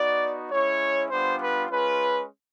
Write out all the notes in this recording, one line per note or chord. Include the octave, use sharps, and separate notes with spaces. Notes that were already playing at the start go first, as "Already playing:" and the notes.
Already playing: B3 D#4 F#4 D5
G#3 C#4 E4 C#5
G3 B3 D4 F4 C5
B4
G#3 C#4 F4 B4